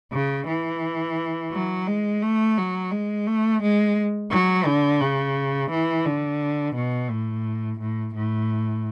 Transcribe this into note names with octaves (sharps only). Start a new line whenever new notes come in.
C#3
E3
F#3
G#3
A3
F#3
G#3
A3
G#3
F#3
D3
C#3
E3
D3
B2
A2
A2
A2